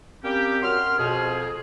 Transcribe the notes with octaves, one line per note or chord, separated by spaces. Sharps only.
G3 A#3 C4 C#4 G4
F#2 F#3 C6 F6
F2 B2 G#4